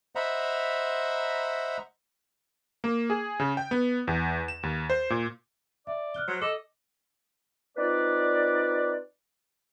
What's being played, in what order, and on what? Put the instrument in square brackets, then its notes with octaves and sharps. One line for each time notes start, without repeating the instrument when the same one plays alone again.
[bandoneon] C5 D#5 E5 F#5 A#5 B5
[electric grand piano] A#3
G#4
C#3
G5
B3
E2
E7
D#2
C5
A#2
[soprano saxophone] D5 [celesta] E5
[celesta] F6 F#6 G7
[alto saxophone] F#3 [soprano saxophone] C5
[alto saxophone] A4 [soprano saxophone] D#5 [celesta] D6
[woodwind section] C4 D#4 F4 B4 D5